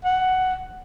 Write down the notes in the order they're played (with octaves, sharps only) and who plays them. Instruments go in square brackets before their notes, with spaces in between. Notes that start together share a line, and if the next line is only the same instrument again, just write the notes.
[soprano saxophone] F#5